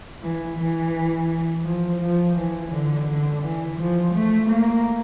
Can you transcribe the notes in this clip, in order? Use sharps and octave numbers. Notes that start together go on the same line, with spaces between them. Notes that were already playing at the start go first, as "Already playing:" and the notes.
E3
E3
F3
F3
E3
D3
D3
E3
F3
A3
A#3